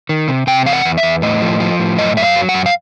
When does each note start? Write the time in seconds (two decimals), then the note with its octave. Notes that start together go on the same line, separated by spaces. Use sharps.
0.09 D#3
0.28 C3
0.47 C3 G5
0.66 E2 F5
0.73 F#5
0.85 E2
0.97 E5
1.03 E2
1.22 A2 D#5
1.42 F3
1.60 F3
1.80 A2
1.97 F#2 D#5
2.17 F#2 E5
2.23 F5
2.36 F#3
2.49 F#5
2.54 F#2
2.66 F5